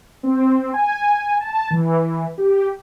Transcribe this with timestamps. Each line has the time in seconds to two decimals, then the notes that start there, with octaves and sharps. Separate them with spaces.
0.23 C4
0.74 G#5
1.41 A5
1.71 E3
2.38 G4